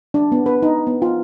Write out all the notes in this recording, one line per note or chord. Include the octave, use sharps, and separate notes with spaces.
D4
B3
B4
D#4
B3
F4